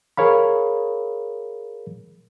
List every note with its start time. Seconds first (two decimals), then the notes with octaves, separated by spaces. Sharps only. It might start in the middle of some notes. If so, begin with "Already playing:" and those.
0.17 G#4 A#4 C#5 F5 B5